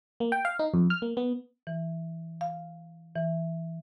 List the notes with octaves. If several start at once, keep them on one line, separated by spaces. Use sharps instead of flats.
A#3
G5
F5
D#4
F2
F6
A#3
B3
E3
F5
E3